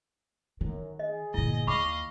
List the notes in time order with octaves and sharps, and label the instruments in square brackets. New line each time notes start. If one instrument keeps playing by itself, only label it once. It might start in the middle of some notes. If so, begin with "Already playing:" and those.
[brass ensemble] F#2 [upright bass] D#3
[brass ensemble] G#4 [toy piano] D#5
[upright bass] G1 A#2 [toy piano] E4 [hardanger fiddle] D#5
[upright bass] D#2 [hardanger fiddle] D#5 F5 [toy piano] B5 C#6 D6